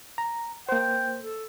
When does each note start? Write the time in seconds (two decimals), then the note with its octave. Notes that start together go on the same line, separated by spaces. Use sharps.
0.18 A#5
0.69 A#3 C5 G5
1.20 A4